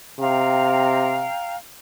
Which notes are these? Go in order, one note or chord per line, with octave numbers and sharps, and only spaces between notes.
C3 F5 G5 A#5